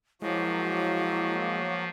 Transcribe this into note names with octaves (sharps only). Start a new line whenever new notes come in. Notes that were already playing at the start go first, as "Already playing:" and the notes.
F3 F#3 G#3 A#3 E4 F#4